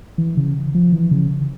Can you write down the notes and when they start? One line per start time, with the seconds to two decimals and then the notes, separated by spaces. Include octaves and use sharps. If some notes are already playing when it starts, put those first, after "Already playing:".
0.18 E3
0.37 C#3
0.75 F3
0.92 E3
1.11 C#3